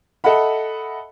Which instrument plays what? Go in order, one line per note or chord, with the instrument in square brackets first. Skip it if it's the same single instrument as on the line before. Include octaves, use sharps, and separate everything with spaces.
[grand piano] A4 D#5 E5 F#5 B5